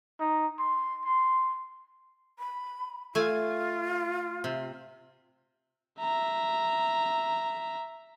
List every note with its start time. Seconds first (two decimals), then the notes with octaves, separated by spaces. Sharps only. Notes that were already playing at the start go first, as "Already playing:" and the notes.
0.20 D#4
0.59 C6
1.05 C6
2.39 B5
3.15 A3 F4 G#5
4.44 C3
6.00 E5 A#5